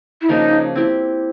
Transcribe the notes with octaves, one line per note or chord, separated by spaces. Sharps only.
E4
C#3 F3 A#3 D4 D#4
C4 E4 G4